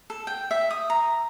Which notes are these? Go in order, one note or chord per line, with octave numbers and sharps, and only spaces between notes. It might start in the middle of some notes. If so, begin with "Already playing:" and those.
A4
G5
E5
D#6
A#5